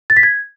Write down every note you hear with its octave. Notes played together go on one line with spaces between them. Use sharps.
A6
B6
G#6